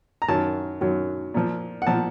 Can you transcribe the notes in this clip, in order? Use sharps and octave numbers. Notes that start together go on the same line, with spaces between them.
A#5
F#2 D#3 F#3 A5
F#2 D#3 F#3
A#2 F3
F#5
A#2 F3 A5